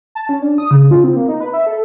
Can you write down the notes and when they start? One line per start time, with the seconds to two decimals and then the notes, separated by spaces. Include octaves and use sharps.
0.15 A5
0.29 C#4
0.42 D4
0.58 D#6
0.71 C#3
0.91 F4
1.04 C4
1.16 A#3
1.28 D#4
1.41 B4
1.53 E5
1.67 A4